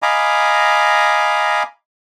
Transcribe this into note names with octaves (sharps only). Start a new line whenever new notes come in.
D#5 F5 G#5 A#5 B5 D6